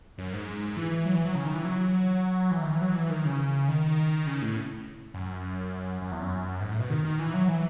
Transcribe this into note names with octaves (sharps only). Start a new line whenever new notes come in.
F#2
G#2
E3
E3
F#3
E3
F#3
C#3
D#3
E3
F#3
E3
D#3
E3
F#3
E3
D#3
C#3
D#3
C#3
A2
F#2
F#2
E2
F#2
G#2
A2
B2
D#3
D#3
E3
F#3
E3